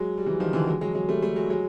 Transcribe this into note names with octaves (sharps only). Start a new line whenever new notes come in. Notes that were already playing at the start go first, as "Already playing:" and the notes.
Already playing: F#3 G#3
G3
E3 F#3
D#3 F3
D3 E3
F#3 G#3
F#3 G#3
F#3 G#3
G3 A3
G3 A3
F#3 G#3
F#3 G#3